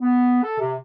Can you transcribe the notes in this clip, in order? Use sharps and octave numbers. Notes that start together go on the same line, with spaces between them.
B3
A4
C3